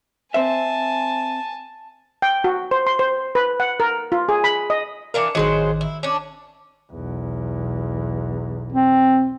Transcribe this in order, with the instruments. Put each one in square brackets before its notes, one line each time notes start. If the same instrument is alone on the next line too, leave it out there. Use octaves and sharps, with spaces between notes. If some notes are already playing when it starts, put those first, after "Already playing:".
[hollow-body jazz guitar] C4 C5 E5 [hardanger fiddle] G#5 A5
[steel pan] G5
F#4
C5
C6
C5
B4
F#5
A#4
F4
G#4
B5
D#5
[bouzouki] E3 D4 F5 [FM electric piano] A#4 C#7
[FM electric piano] A1 D#3 D#5 [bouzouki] F#3 G#3 C5
[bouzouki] E4
C#4 D4
[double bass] B1 E2
[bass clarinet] C4